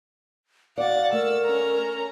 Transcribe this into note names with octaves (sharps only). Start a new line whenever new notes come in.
F#4 D5 F5 F#5 A6
A3 A#4 E6
C#4 A#5